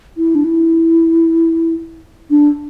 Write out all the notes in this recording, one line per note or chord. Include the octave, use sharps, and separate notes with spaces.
E4
D4
E4
D4